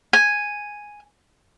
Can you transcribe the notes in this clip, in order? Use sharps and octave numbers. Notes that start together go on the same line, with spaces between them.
G#5